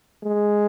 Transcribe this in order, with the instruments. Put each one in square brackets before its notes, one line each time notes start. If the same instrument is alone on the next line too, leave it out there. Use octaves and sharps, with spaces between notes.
[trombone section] G#3